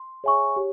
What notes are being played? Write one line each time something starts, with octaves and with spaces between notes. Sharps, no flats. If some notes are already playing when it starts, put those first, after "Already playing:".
Already playing: C6
G#4 C#5 E5 G#5 C#6
G4 C#5